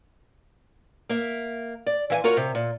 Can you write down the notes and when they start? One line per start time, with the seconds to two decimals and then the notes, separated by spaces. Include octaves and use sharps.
1.09 A#3 E5
1.86 D5
2.10 E3 E5 G#5
2.24 F4 F#4 A#4 C#5
2.37 C3
2.55 A#2